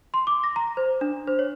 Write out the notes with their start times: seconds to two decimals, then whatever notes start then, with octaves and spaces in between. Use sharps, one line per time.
0.14 C6
0.27 D6
0.44 A#6
0.56 A#5
0.77 C5
1.01 D4
1.27 C5
1.39 C#5